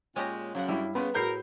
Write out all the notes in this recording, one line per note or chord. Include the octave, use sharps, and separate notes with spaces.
A#2 G#3 C#4 G4 A#5
F#2 C#3 F#3 F5 F#5
G2 G3 E4
C#3 B3 B4 F#5 C6
A2 F#4 G#4 A#4 B5 G6 C7